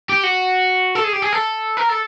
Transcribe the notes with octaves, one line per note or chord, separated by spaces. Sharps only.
G4
F#4
A4
G#4
G4
G#4
A4
A#4
A4